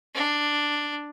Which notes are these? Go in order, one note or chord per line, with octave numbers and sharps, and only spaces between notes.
D4